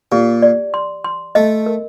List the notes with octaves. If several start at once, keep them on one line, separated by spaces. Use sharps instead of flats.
A#2 G4
D5
C6
C6
A3 D#5
A#4